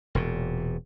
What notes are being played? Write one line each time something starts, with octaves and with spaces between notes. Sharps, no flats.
E1 A#2